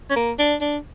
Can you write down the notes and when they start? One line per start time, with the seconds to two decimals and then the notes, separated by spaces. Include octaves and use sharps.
0.11 C#4
0.16 A#3
0.39 D4
0.61 D4